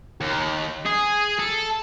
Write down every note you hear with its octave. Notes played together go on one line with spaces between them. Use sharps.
D#2
G#4
A4